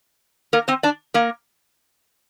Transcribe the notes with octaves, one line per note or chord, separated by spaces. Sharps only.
A#3 A#4
C4 C5
D4 D5
A#3 A#4